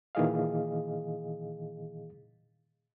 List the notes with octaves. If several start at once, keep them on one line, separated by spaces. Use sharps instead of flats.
A#2 D#3 E3 G#4 D#5 F5